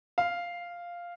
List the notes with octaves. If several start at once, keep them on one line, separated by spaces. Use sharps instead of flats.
F5